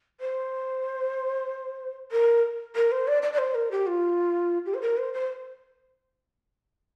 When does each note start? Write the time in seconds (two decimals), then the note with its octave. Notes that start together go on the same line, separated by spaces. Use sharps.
0.20 C5
2.12 A#4
2.76 A#4
2.92 C5
3.08 D5
3.22 D5
3.33 D5
3.38 C5
3.55 A#4
3.71 G4
3.87 F4
4.66 G4
4.74 C5
4.82 A#4
4.98 C5
5.14 C5